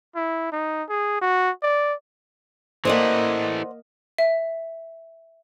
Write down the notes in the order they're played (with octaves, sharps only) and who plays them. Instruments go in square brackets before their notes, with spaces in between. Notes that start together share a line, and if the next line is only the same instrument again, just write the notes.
[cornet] E4
D#4
G#4
F#4
D5
[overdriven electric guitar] E3 A3 [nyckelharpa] A#3 D#5 [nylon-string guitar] C5 D5 F#5
[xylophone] E5